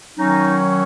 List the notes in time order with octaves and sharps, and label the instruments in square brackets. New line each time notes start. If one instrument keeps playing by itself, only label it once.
[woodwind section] D#3 F#3 C#4 D#4